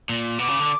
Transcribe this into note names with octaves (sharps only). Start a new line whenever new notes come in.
A#2
B2 D6
C#3
D3